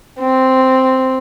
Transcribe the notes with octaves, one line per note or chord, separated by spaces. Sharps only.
C4